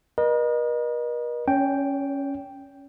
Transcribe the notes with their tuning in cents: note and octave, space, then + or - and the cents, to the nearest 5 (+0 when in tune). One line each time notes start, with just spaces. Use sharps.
A#4 +45 D#5 -30
C#4 +0 C#5 +40 G5 +0